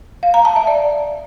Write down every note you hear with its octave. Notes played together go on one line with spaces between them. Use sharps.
F5
A#5
A5
E5
D5